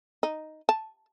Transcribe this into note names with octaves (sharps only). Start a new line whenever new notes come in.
D#4
A5